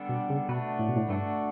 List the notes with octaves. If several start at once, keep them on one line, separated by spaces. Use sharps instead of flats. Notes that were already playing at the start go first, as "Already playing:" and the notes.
Already playing: D3 G3 B3 D4 A4
B2
C#3
B2 A3 D4 F#4 B4
A2
B2
A2
G2 D3 A3 D4 F#4